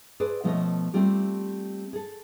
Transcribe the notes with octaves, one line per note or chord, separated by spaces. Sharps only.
G#4 A4 B4 C5 D5
B2 F3 A3 C#4 C#5 D#5
G3 A3 C4 F4 G4
G#4 A4